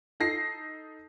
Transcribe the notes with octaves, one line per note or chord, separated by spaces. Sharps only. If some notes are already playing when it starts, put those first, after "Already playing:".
D#4 A4 A#6 C7